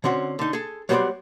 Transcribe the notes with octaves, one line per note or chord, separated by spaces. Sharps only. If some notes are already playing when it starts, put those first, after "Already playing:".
D3 C4 C#4 F#4
D3 D#4
G#4 A4
F#3 G3 B3 F#4 C5 D5